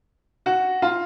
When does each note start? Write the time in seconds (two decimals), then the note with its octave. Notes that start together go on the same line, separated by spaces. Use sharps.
0.46 F#4
0.82 F4